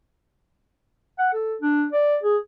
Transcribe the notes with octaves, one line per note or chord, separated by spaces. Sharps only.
F#5
A4
D4
D5
G#4